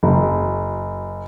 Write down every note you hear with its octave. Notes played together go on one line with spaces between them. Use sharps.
F#1